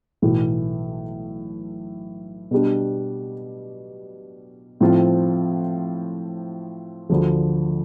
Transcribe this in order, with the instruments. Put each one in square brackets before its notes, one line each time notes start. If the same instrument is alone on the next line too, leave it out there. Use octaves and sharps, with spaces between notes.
[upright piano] B1 A2 E3
B2 G3 D4
A2 F3 C4 F4
D2 D3 F3